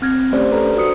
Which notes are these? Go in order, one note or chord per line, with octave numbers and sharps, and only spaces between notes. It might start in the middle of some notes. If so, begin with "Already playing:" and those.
C4 F6 F#6 G#6 A#6
A3 C#4 G4 C5 D5
A4 B4 D5 A#5
D4
F#4 C5 D#6 C#7